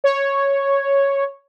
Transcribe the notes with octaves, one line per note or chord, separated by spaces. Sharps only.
C#5